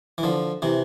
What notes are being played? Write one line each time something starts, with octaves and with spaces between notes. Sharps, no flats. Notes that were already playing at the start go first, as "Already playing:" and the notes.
E3
D3 F3
C3 E3